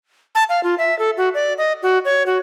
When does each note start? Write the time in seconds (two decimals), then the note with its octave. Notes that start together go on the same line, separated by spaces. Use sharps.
0.35 A5
0.49 F5
0.63 F4
0.78 E5
0.99 A4
1.17 F#4
1.34 D5
1.58 D#5
1.83 F#4
2.05 C#5
2.26 F#4